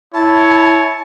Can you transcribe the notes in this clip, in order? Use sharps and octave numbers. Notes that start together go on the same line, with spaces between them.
E4 C#5 A5